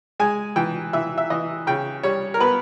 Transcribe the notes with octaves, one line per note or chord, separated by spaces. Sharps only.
G#3 G#5
E3 G5
E3 E5
E5
E3 D#5
C#3 G5
G3 C#5
A#4
B3 B4